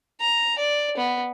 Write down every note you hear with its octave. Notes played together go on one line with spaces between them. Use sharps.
A#5
D5
B3